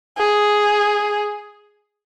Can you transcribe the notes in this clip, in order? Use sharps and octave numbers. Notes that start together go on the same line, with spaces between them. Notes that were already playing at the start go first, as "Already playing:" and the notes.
G#4